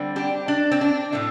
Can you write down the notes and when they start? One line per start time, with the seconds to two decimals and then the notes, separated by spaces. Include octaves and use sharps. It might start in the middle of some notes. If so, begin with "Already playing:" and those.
Already playing: D3 G3 C4
0.16 D4 G4
0.48 D4
0.71 C4
0.81 D4
1.12 A2 A3 C4